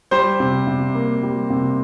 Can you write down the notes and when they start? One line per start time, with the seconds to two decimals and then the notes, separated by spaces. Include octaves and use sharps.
0.11 G3 C5
0.40 C3
0.67 C3
0.95 A#3
1.23 G3
1.50 C3